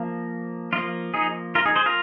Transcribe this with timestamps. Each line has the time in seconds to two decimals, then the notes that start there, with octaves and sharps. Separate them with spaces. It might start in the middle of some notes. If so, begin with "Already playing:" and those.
Already playing: F3 A#3
0.73 F3 A#3 F4
1.14 D#4 G#4
1.55 F4 A#4
1.65 D#4 G#4
1.76 G#4 C5
1.86 F4 A#4